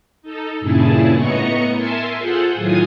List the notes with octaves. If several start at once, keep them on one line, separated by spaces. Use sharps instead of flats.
D#4 A4
G2 A#2 C#3 E4 G#4 A5
A2 B3 D#5 A#5 C#6 C#7
A#4 E5 G#5 A5 C6
F4 G#4 A4 C5 F#5
A2 D#3 F#3 F4 G#5 D#6